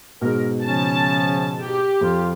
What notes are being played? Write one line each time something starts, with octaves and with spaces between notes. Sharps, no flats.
G#2 B2 A#4
C#3 F3 C#4 A5
G4
F2 F4